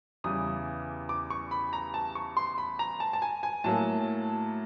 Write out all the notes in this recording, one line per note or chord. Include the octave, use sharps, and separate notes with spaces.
E2 C#3 E3 G3 D#6
D6
C#6
B5
A#5
A5
C#6
C6
B5
A#5
A5
A5
G#5
G#5
A2 F#3 A#3 A5